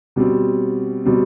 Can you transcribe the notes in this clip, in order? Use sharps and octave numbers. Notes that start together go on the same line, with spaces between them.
B2 G3 C4
B2 G3 C4